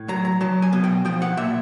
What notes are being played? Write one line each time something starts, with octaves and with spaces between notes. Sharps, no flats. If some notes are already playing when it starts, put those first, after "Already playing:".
Already playing: A2
F#3 A#5
A#5
F#3 A5
G#5
B2
G5
F3 G5
F#5
A#2 E5